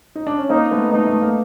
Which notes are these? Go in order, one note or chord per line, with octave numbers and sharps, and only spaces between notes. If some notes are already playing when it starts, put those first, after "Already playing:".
D#4
D4
C#4
A#3 C4 D#4
A3 B3
A3 B3 D#4
A3
A#3